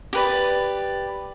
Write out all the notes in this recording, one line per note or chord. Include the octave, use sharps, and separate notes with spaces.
G4 B4 D5